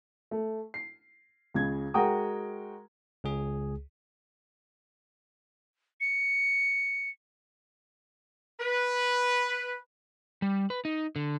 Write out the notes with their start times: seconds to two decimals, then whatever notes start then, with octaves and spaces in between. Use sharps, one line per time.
0.31 A3
0.74 C7
1.54 C#2 C#3 G#6
1.94 G#3 F#4 A#4 G5 A#5 D#6
3.24 C#2 G#4
6.01 C#7
8.60 B4
10.42 G3
10.70 B4
10.85 D#4
11.16 D3